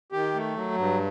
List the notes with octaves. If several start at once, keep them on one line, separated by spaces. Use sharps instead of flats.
D#3 G4
A3
F#3
G2